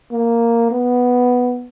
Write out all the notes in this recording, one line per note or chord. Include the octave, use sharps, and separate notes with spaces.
A#3
B3